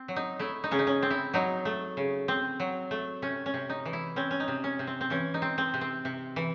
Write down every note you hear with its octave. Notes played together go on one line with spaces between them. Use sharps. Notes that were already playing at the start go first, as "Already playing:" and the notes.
Already playing: C4
F#3
D#4
A3 E4
D#4
C#3 C#4
D#4
C#4
C4
E4
F#3 D#4
A3
C#3
C4
F#3
A3
C3 C#4
C#4
C3
D#4
E3
E4
C4 C#4
C#4
D#4
C3
C#4
C3
C4
C4
E3 C#4
D#4
C4
C4
C3
C4
C3
E3